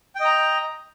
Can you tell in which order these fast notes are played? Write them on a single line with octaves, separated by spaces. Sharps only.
G5 D#5 A#5